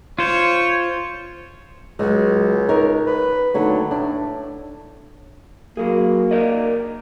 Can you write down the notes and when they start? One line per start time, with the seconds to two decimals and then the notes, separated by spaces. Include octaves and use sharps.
0.19 F4 C5 C#5
1.99 C#2 F#3 G#3
2.69 D#4 A#4 C#5
3.07 B4
3.54 D#2 D3 F#3 A3
3.91 A2 D4
5.77 F#3 A#3 G#4
6.31 A#4 D5 D#5